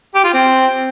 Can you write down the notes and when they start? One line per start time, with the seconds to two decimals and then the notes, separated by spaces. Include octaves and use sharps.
0.15 G4
0.24 F4
0.34 C4